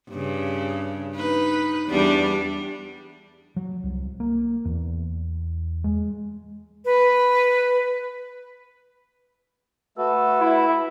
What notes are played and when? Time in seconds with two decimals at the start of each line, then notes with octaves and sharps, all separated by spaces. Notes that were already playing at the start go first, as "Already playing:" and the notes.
0.10 G2 C#3
1.15 D#4 B4
1.88 E2 G3 D4
3.56 F#3
3.84 C2
4.20 A#3
4.65 E2
5.84 G#3
6.85 B4
9.98 A3 F#4 A4 B4
10.40 E4